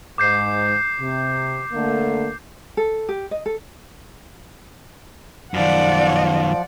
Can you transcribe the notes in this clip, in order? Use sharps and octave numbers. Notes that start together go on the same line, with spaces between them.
G#2 D6 G6 C7
C3
D3 A3 A#3
A4
G4
D#5
A4
F#2 D#3 F3 D5 F#5